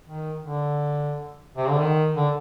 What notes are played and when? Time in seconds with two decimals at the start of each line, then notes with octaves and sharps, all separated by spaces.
0.07 D#3
0.41 D3
1.56 C3
1.69 D3
1.80 D#3
2.16 D3